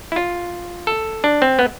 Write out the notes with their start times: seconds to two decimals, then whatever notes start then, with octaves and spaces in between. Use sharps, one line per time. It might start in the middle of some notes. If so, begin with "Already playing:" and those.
0.12 E4
0.16 F4
0.87 A4
1.24 D4
1.42 C4
1.59 B3